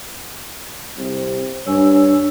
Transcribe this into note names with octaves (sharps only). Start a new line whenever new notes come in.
C2 C3
G2 D4 C#5 G#5 E6